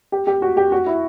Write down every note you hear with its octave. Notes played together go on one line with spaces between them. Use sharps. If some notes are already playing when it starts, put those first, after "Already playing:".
G4
G4
F#4
G4
F#4
E4